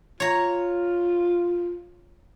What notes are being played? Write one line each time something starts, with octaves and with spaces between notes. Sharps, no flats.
F4 C#5 A#5